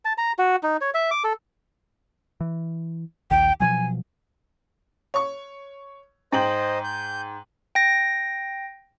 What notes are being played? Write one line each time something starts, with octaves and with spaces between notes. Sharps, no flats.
A5
A#5
F#4
D#4
C#5
E5
D6
A4
E3
A#1 D#2 D#3 G5
B2 F3 F#3 G#5
C#5 C#6
G#2 C5 D#5 G5 F#7
G6
G5 A#6